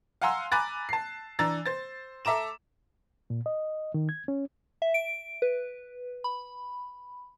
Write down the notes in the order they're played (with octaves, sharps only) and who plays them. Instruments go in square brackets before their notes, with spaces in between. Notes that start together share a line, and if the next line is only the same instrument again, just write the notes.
[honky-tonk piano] F5 F#5 G#5 A#5 C6 E6
G#5 A#5 B5 D6 F#6 A6
A5 C7
E3 D4 A#5 E6 A6
C5 A6
A4 E5 A#5 D6 E7
[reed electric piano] A#2
D#5
D#3
G#6
C#4
[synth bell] E5
D7
B4
B5